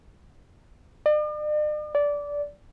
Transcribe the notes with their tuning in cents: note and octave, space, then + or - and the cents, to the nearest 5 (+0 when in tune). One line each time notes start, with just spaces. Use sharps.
D5 +45
D5 -15